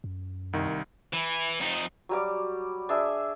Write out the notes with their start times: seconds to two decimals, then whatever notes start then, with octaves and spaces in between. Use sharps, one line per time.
0.04 F#2
0.53 C2 D#3
1.13 E3
1.60 F2 D#4
2.09 F#3 G3 D6
2.89 D4 G#4 E5